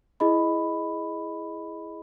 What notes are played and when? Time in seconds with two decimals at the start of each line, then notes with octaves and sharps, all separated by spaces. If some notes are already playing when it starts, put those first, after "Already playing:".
0.20 E4 G#4 D#5 B5